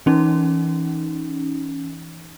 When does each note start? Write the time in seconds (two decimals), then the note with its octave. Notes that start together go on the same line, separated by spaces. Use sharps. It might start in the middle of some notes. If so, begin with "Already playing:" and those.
0.06 E3 C#4 D#4